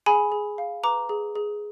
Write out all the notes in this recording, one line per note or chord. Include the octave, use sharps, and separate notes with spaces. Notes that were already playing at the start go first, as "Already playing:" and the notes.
G#4 G#5 B5
G#4
F5
B4 A#5 D6
G#4
G#4